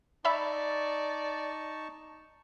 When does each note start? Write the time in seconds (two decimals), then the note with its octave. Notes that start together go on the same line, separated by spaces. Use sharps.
0.25 D#4 D5 E5 A5 B5 C#6